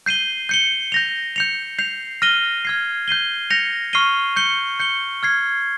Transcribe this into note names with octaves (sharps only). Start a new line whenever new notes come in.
G6 C7 D#7 G7
G6 C#7 G7
G6 A#6 F7
G6 C#7 F7
G6 C7 F7
F6 A#6 D#7 G7
F6 G#6 C7
G6 C7 D#7 G7
G6 A#6 C#7 F7
C#6 F6 C7 D#7 G7
G6 C#7 G7
G6 C#7 G7
F6 G#6 C7